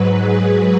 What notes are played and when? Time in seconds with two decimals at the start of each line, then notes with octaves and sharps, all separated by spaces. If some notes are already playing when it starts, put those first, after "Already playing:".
Already playing: G#2 F#3 B4
0.20 G#4